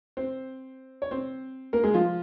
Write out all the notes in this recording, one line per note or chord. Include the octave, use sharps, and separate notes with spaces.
C4 C5
C#5
C4 C5
A#3 A#4
G#3 G#4
F3 F4